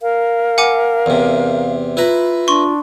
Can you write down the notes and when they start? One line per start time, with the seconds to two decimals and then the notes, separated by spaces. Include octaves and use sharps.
0.02 A#4 F5
0.58 F#5 G#5 D6
1.06 E2 C3
1.97 E4 F4 B4 A#5
2.48 D4 C6 C#6